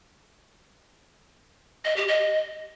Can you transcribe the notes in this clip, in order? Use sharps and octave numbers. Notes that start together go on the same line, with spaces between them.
D#5
G4
D#5